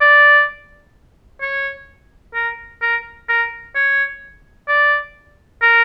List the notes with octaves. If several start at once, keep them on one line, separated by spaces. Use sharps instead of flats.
D5
C#5
A#4
A#4
A#4
C#5
D5
A#4